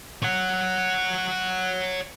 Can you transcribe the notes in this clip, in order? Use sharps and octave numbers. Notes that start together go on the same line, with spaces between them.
C#5 F#5